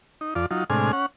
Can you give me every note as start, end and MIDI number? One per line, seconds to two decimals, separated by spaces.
0.21 0.34 63
0.35 0.46 41
0.35 0.46 65
0.35 0.46 74
0.51 0.64 54
0.51 0.64 63
0.51 0.64 65
0.70 0.92 45
0.70 0.92 48
0.70 0.92 56
0.70 0.92 62
0.70 0.92 80
0.70 0.92 89
0.93 1.06 61
0.93 1.06 78